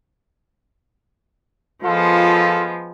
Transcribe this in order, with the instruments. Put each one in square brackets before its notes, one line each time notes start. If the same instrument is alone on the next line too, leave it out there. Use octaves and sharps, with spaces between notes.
[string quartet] F3 G#3 B3 [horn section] F4 A4